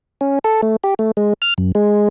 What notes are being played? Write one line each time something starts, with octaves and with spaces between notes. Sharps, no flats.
C#4
A4
A3
G4
A3
G#3
F6
F#2
G#3